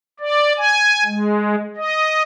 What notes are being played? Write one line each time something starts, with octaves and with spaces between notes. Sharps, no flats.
D5
G#5
G#3
D#5